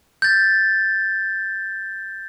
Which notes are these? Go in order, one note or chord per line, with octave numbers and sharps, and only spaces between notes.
G6 A6